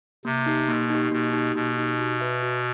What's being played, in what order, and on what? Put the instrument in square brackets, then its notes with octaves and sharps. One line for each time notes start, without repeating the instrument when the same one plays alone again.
[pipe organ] C3 [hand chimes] A#3
[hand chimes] D#4 G4
[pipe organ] B2 [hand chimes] A#3
[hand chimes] D#4 G4
[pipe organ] B2 [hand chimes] A#3
[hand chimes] D#4 G4
[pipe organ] B2 [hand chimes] A#3
[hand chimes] D#4 G4
F#4
B4 E5
F#4